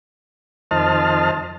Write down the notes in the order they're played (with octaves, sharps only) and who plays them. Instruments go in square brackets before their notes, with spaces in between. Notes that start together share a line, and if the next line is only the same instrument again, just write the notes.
[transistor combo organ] F2 D#3 C5 D#5 A5 F6